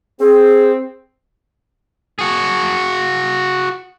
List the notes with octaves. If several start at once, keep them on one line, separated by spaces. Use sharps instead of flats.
C4 G#4
F#4 G#4